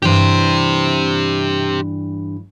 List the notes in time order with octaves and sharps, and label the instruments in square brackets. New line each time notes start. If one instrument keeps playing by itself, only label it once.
[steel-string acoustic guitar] G2 E3 D4 [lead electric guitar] G4 C5